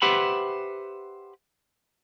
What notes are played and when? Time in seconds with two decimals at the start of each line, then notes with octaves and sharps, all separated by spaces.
0.02 G4 B4 C5 E5 F#5 B5